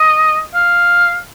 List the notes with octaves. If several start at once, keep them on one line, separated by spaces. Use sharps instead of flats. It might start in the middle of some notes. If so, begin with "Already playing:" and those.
Already playing: D#5
F5